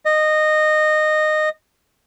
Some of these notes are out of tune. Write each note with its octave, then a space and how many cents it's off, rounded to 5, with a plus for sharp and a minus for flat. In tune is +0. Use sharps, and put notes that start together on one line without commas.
D#5 -15